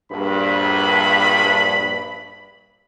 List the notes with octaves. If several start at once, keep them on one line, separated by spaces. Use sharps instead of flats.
A#1 G2 B5